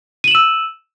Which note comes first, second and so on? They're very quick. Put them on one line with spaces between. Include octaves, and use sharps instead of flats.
D#7 F#7 E7 E6